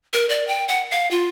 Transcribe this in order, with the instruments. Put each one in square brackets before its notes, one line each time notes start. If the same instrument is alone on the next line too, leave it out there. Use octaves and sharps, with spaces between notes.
[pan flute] A#4
D5
G5
F#5
F5
F4